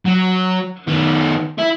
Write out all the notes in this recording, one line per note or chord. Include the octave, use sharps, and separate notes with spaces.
F#3
D#3 B3
E4